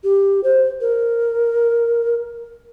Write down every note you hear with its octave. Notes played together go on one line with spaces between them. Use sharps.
G4
C5
A#4